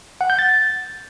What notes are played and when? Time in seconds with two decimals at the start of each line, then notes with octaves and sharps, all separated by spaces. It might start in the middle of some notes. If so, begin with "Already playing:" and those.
0.21 F#5
0.30 G6
0.39 A6